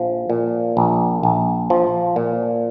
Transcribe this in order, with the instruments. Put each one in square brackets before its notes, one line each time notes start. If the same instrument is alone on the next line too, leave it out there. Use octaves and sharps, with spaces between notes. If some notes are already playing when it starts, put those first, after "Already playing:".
Already playing: [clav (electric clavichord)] A#1 F3
A#2
A#1
A#1
F3
A#2